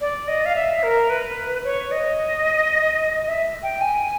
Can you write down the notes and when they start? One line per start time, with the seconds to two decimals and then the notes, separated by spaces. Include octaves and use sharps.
0.01 D5
0.28 D#5
0.46 F5
0.55 E5
0.83 A#4
1.10 B4
1.64 C#5
1.92 D#5
3.27 E5
3.63 G5
3.81 G#5